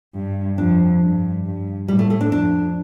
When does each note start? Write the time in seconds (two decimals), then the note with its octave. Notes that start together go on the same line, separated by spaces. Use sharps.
0.15 G2
0.58 F2 D4
1.01 G2
1.45 G2
1.88 A2 G3
1.99 A3
2.10 A3
2.21 D4
2.32 F2 D4